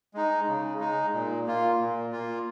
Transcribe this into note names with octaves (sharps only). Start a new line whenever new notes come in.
G#3 D#4
C#3
G#3 D#4
A#2
A#3 F4
A#2
A#3 F4